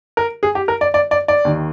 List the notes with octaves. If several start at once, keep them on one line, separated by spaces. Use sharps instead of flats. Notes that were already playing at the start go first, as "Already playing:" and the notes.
A#4
G#4
G4
A#4
D5
D5
D5
D5
D#2 D#3